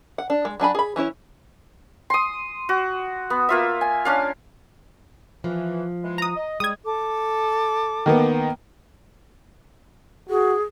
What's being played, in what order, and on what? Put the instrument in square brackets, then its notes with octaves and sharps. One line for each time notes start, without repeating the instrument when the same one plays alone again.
[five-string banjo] F#5
D4
G#3
F#3 D4 G#5 B5
G#4 B5
E3 C#4 E4 C#5
[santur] C6 D#6
F#4
B3
A#3 F4 E5
G#5
C#4 D4 F5
[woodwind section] E3 [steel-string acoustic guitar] F3
[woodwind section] E3 G#3
[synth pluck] A#5 D#6
[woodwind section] D#5
[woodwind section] G3 [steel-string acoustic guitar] G#3 [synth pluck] D#6 G#6
[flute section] A4 D6
[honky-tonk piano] D#3 A#3 B3
[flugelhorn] F#4 [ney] G#4